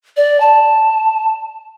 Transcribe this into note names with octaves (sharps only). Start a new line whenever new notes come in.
D5
A5